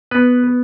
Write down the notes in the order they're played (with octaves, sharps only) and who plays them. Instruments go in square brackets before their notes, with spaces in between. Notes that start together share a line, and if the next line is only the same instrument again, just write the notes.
[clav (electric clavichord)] B3 B4